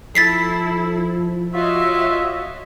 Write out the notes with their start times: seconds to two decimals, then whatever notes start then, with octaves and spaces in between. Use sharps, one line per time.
0.15 F3 E4 A4 A6 B6 C7
1.53 F4 F#4 C#5 D#5 E5